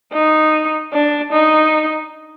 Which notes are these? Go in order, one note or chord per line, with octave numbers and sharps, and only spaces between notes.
D#4
D4
D#4